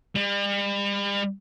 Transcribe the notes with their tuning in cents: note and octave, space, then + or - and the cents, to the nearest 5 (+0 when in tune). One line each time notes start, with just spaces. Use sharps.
G3 +40